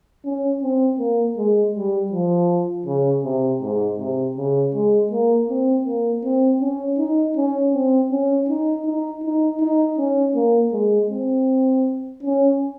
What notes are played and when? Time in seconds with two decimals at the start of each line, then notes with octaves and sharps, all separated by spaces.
0.25 C#4
0.63 C4
0.99 A#3
1.37 G#3
1.75 G3
2.12 F3
2.86 C#3
3.24 C3
3.61 G#2
3.99 C3
4.37 C#3
4.74 G#3
5.12 A#3
5.49 C4
5.86 A#3
6.24 C4
6.61 C#4
6.98 D#4
7.36 C#4
7.73 C4
8.11 C#4
8.49 D#4
8.86 D#4
9.23 D#4
9.61 D#4
9.98 C#4
10.35 A#3
10.73 G#3
11.11 C4
12.23 C#4